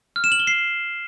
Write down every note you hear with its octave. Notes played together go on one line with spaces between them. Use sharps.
F6
E7
F#7
G7
C7